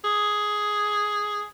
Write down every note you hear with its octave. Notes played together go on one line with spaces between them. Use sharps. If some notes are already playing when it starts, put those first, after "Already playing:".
G#4